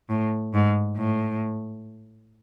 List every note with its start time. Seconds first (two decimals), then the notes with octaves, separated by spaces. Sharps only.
0.09 A2
0.54 G#2
0.97 A2